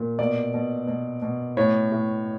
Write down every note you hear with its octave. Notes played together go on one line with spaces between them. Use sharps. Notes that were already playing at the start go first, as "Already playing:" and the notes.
Already playing: A#2
B2 D5
B2
B2
B2
A2 C#5
A2